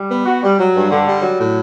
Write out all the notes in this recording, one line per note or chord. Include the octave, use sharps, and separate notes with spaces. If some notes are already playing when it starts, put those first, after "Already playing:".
Already playing: G3
B3
F#4
G3
F#3
G2
D3
G3
F#3
A2